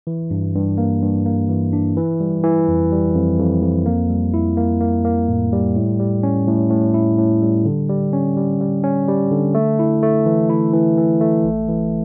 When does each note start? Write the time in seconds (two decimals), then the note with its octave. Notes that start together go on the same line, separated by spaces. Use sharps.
0.07 E3
0.31 G2
0.55 G2
0.78 A#3
1.02 G2
1.26 A#3
1.49 E3
1.73 D4
1.97 E3
2.21 G3
2.43 E3
2.68 F2
2.92 G3
3.15 F2
3.39 F2
3.62 F2
3.86 A#3
4.10 G3
4.34 E4
4.57 A#3
4.81 A#3
5.05 A#3
5.28 A2
5.52 G3
5.76 A2
5.99 G3
6.23 C#4
6.47 A2
6.70 A2
6.94 E4
7.18 A2
7.42 G3
7.65 D3
7.89 G3
8.13 C#4
8.37 G3
8.61 G3
8.84 C#4
9.08 G3
9.31 D3
9.54 A3
9.79 E4
10.02 A3
10.26 E3
10.50 E4
10.73 E3
10.98 E3
11.21 A3
11.44 A1
11.68 E3